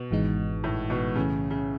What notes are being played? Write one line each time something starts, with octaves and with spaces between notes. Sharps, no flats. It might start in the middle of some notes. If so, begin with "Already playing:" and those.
Already playing: B2
G#1 G#2 E3 G#3 D#4
A2
B2
B1 A2 C#3 E3 A3
C#3